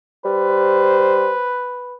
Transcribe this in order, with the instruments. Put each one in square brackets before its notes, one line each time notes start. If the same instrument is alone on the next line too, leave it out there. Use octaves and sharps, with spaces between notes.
[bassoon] G3 [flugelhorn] B4 [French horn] C5